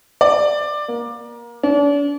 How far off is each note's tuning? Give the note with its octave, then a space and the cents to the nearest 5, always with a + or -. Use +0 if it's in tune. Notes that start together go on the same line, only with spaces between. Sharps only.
D5 +15
A#3 +25
D4 -40